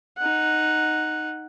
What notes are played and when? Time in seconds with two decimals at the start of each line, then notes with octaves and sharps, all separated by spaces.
0.18 D#4 F#5